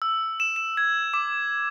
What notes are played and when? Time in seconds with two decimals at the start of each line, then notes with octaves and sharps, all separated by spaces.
0.02 E6
0.40 E7
0.56 E7
0.77 G#6
1.14 D6